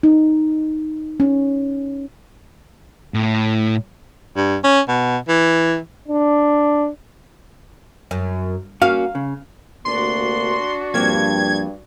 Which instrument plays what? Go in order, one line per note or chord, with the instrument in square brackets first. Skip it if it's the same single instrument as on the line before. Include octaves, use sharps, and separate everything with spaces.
[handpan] D#4
C#4
[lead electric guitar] A2
[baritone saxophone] G2
C#4
B2
E3
[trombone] D4
[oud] F#2
[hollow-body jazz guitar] A#3 C#4 F#4 [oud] F5
[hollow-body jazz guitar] C#3
[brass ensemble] D2 C3 A#3 [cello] D4 F#4 [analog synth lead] C6
[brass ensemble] G2 [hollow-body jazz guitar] F3 A#3 C4 [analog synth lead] G#6